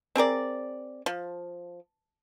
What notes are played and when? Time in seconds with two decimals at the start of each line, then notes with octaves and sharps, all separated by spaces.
0.16 C4 G#4 A#4 D5
1.06 F3